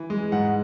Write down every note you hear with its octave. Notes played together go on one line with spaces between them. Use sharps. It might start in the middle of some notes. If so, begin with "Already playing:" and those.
Already playing: E3
G#3
G#2 F#5